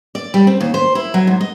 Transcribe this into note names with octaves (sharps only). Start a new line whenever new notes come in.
D5
G3
C4
D#2
C5
E4
F#3
G#2
D#5